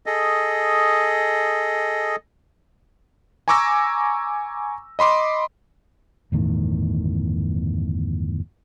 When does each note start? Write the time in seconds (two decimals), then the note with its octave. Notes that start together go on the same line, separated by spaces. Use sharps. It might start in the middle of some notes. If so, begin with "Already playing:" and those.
0.06 G#4 A4 D#5
3.48 G#5 A#5 C#6 D6 E6 A#6
4.99 D#5 B5 C6 D6
6.32 G1 E2 A2 D#3